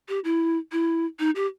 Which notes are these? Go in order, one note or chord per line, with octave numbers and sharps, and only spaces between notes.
G4
E4
E4
D#4
G4